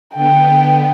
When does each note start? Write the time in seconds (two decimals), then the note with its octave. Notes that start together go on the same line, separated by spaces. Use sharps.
0.14 D3 B3 G5